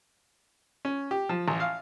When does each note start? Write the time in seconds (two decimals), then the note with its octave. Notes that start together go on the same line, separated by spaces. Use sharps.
0.85 C#4
1.11 G4
1.29 F3
1.48 A1
1.60 F5